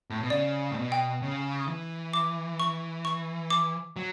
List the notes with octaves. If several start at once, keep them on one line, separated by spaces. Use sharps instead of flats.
A2
B2
C#3 D5
A2
B2
G5
C#3
E3
D6
C#6
C#6
D6
F#3